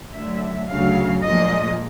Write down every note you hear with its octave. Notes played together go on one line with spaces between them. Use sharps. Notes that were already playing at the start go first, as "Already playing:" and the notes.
D2 D3 F#3 E5
D2 C#3 F#3 F5
A#2 F3 G#3 D#5